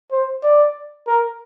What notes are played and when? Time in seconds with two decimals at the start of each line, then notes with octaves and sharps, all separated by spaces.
0.12 C5
0.44 D5
1.07 A#4